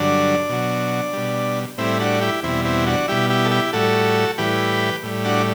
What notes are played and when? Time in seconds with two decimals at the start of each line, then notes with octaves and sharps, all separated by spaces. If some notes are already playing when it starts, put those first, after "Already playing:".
Already playing: G2 D3 F#3 D4
0.49 B2 F#3
1.13 B2 G3
1.78 A2 G3 C4 E4
2.00 D4 F#4
2.21 E4 G4
2.43 E2 B2 G3 C4 E4
2.65 C4 E4
2.87 D4 F#4
3.08 B2 G3 E4 G4
3.30 E4 G4
3.45 A4
3.51 E4 G4
3.73 A2 G3 F#4 A4
4.38 A2 E3 G3 G4 B4
5.03 A2 G3
5.24 D4 F#4